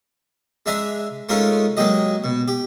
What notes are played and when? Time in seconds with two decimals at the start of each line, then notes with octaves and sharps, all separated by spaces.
0.66 G#3 D4 E5 G#5 A#5
1.29 G#3 A3 C#4 D#4 F4 A#4
1.77 F#3 G#3 A#3 G4 D#5
2.24 B2
2.48 G4